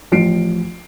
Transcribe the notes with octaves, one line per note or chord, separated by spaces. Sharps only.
A1 F3 F4 C7 D7